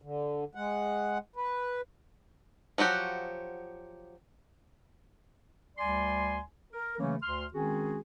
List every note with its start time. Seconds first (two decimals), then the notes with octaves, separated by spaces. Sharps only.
0.02 D3
0.55 G#3 F#5
1.36 B4
2.78 F3 F#3 F#4 G4
5.77 D2 G3 D5 G#5 C6
6.73 A#4
6.99 C#3 E3 F#3 A3 A#3 C#4
7.23 D2 C6 F6
7.54 D#3 G#3 C4 C#4 F#4 G#4